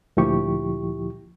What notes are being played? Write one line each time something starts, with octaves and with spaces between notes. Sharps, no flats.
D2 A#2 F3 E4 G4 C#6